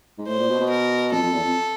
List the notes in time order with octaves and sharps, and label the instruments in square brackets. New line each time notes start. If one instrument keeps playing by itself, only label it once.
[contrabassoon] G#2
[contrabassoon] A2 [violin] C5
[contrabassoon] A#2
B2
B2
[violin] A#4
[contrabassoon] F2 [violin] A4
[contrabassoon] F2
E2
F2